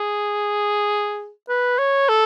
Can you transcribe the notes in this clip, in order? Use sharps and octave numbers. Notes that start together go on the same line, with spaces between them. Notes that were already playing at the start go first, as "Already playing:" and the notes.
Already playing: G#4
B4
C#5
A4